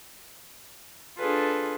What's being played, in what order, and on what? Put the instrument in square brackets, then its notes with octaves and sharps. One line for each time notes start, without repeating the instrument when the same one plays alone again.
[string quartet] D4 F4 G#4 A4 B4